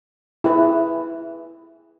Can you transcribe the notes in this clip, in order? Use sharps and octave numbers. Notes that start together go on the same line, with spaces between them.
E4 G#4 B4 E5